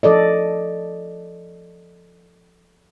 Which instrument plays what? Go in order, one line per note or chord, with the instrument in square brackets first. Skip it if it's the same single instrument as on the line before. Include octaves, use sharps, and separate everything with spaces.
[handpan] F3 A4 D5 D#5